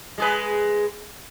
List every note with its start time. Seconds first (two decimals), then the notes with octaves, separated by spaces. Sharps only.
0.18 G#3 G#4 B4